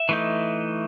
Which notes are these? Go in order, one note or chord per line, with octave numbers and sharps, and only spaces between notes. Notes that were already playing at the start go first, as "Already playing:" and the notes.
Already playing: E5
E3 A3 D#4